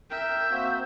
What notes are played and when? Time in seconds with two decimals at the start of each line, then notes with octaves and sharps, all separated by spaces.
0.11 A#4 E5 G5 G6
0.51 A#3 C4 F#4